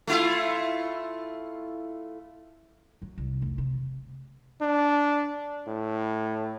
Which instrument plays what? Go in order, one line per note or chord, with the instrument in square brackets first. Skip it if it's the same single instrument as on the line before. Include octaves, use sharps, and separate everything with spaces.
[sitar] A3 E4 F4
[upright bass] F#3
C2
F1
C3
[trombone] D4
A2